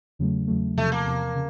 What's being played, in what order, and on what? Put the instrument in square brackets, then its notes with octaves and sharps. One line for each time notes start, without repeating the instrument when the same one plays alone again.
[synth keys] E2 C#3 F#3 A3
E2 C#3 F#3 A3
[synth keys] E2 C3 F3 [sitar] A3
[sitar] A#3
[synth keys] E2 C3 F3
C#3